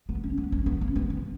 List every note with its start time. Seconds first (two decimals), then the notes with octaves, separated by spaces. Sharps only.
0.09 B3
0.24 C#4
0.38 B3
0.52 C#4
0.66 B3
0.81 C#4
0.96 B3
1.10 B3